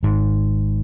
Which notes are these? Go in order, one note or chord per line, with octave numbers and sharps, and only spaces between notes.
G#1 G#2